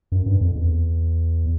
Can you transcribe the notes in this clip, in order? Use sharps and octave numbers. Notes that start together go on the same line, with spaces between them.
F#2
G2
F2
E2